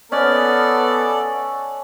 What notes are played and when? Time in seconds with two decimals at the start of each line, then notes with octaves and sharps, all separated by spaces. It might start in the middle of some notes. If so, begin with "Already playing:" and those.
0.12 B3 C#4 A4 D5 D#5 F#5